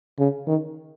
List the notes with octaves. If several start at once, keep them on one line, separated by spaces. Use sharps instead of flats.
C#3
D#3